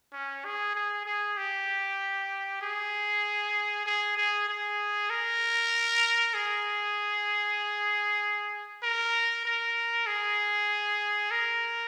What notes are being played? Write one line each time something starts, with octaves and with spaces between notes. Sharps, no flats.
C#4
G#4
G#4
G#4
G4
G#4
G#4
G#4
G#4
A#4
G#4
A#4
A#4
G#4
A#4